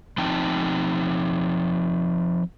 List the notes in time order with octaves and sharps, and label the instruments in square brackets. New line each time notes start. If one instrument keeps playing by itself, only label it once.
[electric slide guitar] F3 C4 D#4 G5 A5